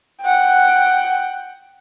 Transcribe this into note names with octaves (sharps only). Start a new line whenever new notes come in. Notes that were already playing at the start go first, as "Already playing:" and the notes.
F#5 G5